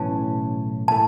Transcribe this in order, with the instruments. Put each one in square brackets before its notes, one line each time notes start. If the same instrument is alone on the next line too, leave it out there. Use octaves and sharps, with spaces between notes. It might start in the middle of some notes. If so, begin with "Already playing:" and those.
Already playing: [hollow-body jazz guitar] B1 A2 E3 C#4 [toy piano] A5
[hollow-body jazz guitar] A2 A3 [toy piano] A5